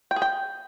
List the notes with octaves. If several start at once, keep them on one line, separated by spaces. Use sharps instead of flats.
G5
G#4
G5